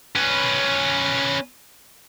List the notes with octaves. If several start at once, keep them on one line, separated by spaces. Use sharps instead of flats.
C#4 B4